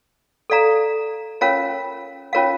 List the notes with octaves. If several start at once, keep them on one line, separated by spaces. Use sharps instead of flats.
A4 D5 F5 A#5
C#4 F4 A#4 C#5 F5
C#4 F4 A#4 C#5 F5